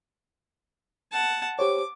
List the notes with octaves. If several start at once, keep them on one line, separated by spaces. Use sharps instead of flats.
F#5 A5
G4 C5 C#5 D6